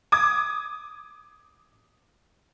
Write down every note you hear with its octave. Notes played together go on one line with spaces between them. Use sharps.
D6 D#6 G#6